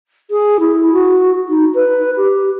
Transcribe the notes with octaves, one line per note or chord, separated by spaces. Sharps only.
G#4
E4
F#4
D#4
B4
G4